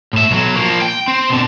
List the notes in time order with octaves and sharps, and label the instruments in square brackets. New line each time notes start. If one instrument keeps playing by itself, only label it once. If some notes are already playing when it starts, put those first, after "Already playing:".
[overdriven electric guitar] A2 E5
B1 F#3
F3 A#3
G5
C4
B2 D3